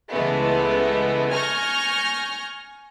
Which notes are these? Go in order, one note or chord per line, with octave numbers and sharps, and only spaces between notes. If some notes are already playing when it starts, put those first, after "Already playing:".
C#2 E3 G#3 A3 B3
G#5 C#6 F6 G6 A#6